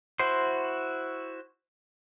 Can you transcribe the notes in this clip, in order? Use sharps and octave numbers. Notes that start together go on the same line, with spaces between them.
E4 F#4 C5 C6